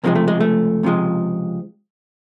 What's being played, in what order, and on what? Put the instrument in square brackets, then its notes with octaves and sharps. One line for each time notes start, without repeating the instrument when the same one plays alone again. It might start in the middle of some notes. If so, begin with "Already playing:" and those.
[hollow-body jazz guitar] C#2 C3 F3 G#3 A#3
A3
G#3
A3
C#2 C3 F3 G#3